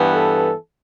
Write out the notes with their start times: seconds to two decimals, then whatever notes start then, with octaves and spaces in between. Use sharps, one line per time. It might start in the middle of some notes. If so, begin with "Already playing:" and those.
Already playing: G2 E3 B3
0.14 A4